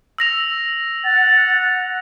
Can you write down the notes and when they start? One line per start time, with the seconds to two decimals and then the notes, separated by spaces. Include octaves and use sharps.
0.18 E6 A#6 F7
1.04 F#5 A6